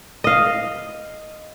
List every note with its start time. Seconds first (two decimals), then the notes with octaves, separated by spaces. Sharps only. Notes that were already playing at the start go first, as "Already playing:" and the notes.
0.24 D#5 F5